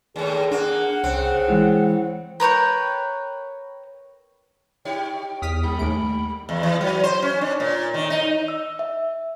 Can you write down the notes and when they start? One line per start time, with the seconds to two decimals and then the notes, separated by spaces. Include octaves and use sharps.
0.16 D#2 A2 G#4
0.51 A#3 D4 F#5
1.04 C2 C#3 C4
1.48 E3 G#3 E4
2.40 A#4 B4 C#5 G5
4.85 D#4 G4 C#5 G5
5.42 E2 D#6 F6 B6
5.63 G3 B5
5.79 D#2 A3 D7
6.49 E2
6.63 E3
6.81 F#3
7.04 C5
7.22 C#4
7.41 D4
7.60 A#2
7.94 D#3
8.10 D#4
8.48 E6
8.79 E5